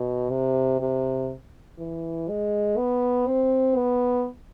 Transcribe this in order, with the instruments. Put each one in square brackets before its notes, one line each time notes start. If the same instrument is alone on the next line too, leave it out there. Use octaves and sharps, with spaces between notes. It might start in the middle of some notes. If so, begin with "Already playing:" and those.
Already playing: [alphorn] B2
C3
C3
E3
G#3
B3
C4
B3